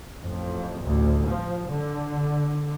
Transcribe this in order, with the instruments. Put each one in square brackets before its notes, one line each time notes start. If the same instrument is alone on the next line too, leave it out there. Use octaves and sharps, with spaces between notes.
[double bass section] A1 F2
A1 D2
F3
D3